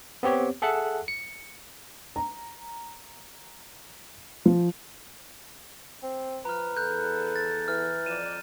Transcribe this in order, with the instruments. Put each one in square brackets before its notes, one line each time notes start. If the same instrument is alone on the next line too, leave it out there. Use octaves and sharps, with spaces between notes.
[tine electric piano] B3 C4 G4 C#5
G#4 A4 E5 F#5 F#6
C#7
[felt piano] A#5
F3
[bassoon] C4
[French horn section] F3 [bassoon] B4 [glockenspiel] A#5 F6
[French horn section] E2 A4 [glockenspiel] F#6 G6
[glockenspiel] A6
[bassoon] E3 [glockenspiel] F6
[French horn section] F2 D5 [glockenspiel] D#7 E7